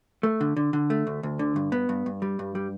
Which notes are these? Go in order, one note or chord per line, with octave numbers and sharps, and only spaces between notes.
A3
D3
D3
D3
A3
D2
D2
D3
G2
B3
G2
G2
G3
G2
G3